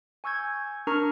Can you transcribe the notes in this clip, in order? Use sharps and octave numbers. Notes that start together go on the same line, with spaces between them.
G#5 C#6 E6 G6 G#6
D4 A#4 A#5 C#6 D#6 F6